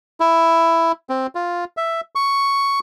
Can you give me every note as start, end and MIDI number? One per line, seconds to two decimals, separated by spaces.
0.20 0.92 64
1.10 1.27 60
1.35 1.65 65
1.77 2.01 76
2.15 2.80 85